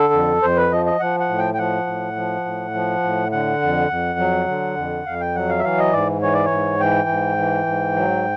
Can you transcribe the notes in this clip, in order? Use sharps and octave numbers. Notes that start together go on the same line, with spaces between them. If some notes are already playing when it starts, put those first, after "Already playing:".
Already playing: D3 A4
F2
F2 C5
B4
F3 D#5
D#5
F3 F#5
F#5
A2
G5
G5
F3 F#5
A2
F3
A2
F3
A2
D3 F#5
F2
F2
F#3
D3
F2
F2 F5
G5
F#3 F#5
F5
E5
E3 F5
D#5
G#2 D5
E3 C#5
D5
C#5
G#2
E3 G5
G#2
E3
G#2
F#3